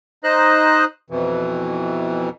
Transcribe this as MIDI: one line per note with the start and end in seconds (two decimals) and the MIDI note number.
0.24 0.85 63
0.24 0.85 72
0.24 0.85 75
0.24 0.85 90
1.10 2.29 41
1.10 2.29 47
1.10 2.29 52